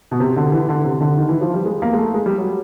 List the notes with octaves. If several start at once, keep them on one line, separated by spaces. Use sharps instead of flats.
B2
C3
D3
E3
D3
C3
D3
D#3
E3
F3
G3
G#3
A#3
G#3
A3
G#3
G3
F#3